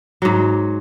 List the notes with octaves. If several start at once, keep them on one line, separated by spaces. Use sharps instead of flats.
G#2 F#3